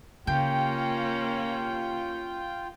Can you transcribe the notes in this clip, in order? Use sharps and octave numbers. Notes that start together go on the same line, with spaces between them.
C#3 A#3 C#4 F4 G4 G5